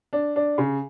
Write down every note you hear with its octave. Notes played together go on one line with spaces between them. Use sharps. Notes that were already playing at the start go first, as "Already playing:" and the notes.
D4
D4
C#3